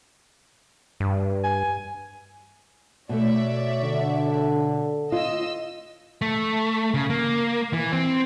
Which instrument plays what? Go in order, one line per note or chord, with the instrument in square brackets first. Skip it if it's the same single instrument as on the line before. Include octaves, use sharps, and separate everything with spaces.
[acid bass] G2
[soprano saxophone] G#5
[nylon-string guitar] B2 A3 [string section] C#5 D5 E5
[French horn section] D3
[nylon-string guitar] F4 [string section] D#5 E6
[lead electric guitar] A3
C#3
A#3
E3
C4